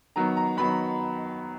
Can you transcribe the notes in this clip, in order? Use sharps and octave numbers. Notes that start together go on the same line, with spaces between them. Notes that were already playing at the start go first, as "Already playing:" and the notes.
D#3 F#3 B3 A#5
A#5
D#3 F#3 B3 B5